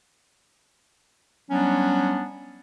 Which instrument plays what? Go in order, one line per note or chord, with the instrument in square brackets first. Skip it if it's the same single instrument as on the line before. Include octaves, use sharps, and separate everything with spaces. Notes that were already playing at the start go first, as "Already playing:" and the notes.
[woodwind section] F#3 G3 B3 C#4 D4